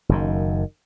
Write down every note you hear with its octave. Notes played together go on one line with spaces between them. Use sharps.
F#1 F#2 D#3